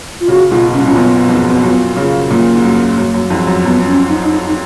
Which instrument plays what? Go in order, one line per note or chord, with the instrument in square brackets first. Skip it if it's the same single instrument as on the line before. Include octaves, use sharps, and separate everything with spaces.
[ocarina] F4
[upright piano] A#2 C#3 [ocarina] F#4
[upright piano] G#2 B2 [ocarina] F4
[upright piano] A#2 [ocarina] C#4
[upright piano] B2
[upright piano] F#2 A#2 [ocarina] C#4
[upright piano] F#2 A#2 [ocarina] B3
[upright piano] F2 G#2
F#2 A#2
A#2 C#3
[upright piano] F#2 A#2 [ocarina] A#3
[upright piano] G#2
F#2
F#2
F#2
F2 G#2
F#2
[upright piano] F#2 [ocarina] B3
[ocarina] C#4
D#4
D#4